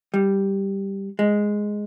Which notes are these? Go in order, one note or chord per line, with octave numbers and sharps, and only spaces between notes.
G3
G#3